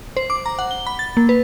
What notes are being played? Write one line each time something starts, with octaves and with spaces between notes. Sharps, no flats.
C5
D6
A#5
F#5
G7
B5
A6
A#3
B4